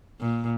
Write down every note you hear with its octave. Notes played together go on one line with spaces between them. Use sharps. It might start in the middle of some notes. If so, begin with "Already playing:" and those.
A#2